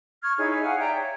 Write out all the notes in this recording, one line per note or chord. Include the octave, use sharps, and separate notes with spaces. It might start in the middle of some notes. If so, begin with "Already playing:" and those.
C#6 F6 G#6
D#4 E4 G#4 C#5
G#4 F5 F#5 G#5
D5 E5 G5 A#5
C#5